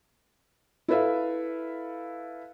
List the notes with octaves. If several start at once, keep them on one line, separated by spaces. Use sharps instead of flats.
E4 A4 B4 E5 F5